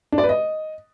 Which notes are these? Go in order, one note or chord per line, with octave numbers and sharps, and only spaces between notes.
D4
D5
B4
D#5